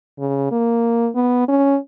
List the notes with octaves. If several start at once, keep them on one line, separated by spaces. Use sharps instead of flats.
C#3
A#3
B3
C#4